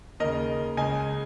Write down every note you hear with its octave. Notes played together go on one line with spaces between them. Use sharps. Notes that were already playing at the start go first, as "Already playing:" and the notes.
D#2 C#3 A#4 D#5
C#2 C#3 D#5 G#5